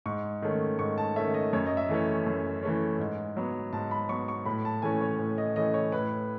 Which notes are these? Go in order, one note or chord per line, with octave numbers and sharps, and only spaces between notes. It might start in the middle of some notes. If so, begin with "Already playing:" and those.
G#2 C#6
D#3 A3 C#4
G#2 C#6
A5
D#3 A3 C#4 E5
D#5
F#2 C#5
D#5
E5
E3 A3 C#4
F#2
E3 A3 C#4
G#2
F#3 B3
G#2 A5
B5
F#3 B3 C#6
C#6
A2 B5
A5
E3 A3 C#4 G#5
C#5
A2
D#5
E3 A3 C#4 D#5
C#5
A2 B4